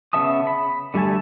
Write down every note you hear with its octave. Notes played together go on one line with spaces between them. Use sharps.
C#3 B3 E5 A5 D#6
B5
D3 G3 A3 G#5 A5